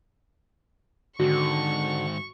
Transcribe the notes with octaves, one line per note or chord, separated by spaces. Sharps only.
G#2 D3 D#3 F#4 C#6